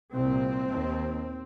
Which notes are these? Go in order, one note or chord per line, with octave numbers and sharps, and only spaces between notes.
C2 A#2 C4
D#2